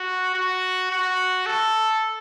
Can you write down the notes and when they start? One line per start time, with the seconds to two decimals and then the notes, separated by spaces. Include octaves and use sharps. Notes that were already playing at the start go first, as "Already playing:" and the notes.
Already playing: F#4
0.35 F#4
0.91 F#4
1.46 A4